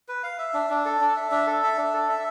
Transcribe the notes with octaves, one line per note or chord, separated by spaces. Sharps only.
B4
F5
E5
D4
D4
A4
D4
E5
D4
A4
E5
D4
A4
E5